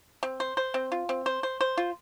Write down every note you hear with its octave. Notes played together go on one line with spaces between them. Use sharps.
C4
C5
C5
C4
F4
C4
C5
C5
C5
F4